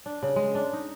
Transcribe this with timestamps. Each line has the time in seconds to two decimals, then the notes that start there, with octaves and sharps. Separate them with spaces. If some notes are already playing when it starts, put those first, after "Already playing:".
0.06 D4
0.23 C#3
0.36 G#3
0.55 D4
0.73 D#4